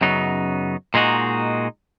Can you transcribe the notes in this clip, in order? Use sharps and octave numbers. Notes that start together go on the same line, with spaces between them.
F#2 C#3 F#3 B3 D#4
A#2 G#3 D#4 F#4